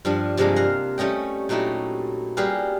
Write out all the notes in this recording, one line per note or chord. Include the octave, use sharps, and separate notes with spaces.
G2 F3 D4
G2 C3 F3 G#3 A#3 D4
A#4 F5 F#5 A#5
G3 A3 C#4 D#5 G5
A#2 F#3 A3 D#4 E4 G4
G3 A#3 G4 G#4 B4 F5